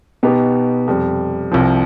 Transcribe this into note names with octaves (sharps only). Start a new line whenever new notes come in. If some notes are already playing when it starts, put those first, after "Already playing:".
B2 B3 D#4 G4
F2 C3 G3
C2 C3 F3